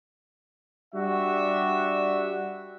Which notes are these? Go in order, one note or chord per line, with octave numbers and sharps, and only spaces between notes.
G3 D4 F#4 E5